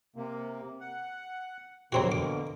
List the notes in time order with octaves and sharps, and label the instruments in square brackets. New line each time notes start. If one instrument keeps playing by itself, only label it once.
[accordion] C3 A#3
F#5
[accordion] B2 D3 A#3 [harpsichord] F#3 C4 F#4
[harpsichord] D6